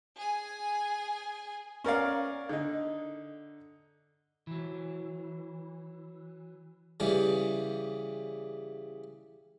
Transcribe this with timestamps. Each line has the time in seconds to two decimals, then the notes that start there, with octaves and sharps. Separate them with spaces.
0.17 G#4 G#5
1.84 C#4 A#4 D5 F5
2.49 D3 D#4
4.47 E3 F#3
7.00 C#3 E3 G3